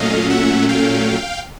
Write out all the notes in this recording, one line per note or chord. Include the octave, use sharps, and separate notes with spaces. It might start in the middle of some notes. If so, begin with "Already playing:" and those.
Already playing: A#2 F#3 A3 C#4 D#5 F5
E5 F#5
F5 G5